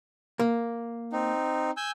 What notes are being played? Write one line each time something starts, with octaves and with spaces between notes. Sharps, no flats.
A#3
C4 D#4
G#5 E6 G6